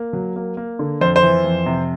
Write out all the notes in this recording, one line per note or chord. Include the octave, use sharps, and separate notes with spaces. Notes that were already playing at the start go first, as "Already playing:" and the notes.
Already playing: A#3
F#3
A#3
A#3
D3
F2 C5
C5
E3
F2
C3